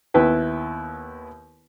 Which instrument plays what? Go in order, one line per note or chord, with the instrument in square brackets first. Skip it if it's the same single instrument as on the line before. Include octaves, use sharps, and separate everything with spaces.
[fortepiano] D#2 B3 E4 B4 G5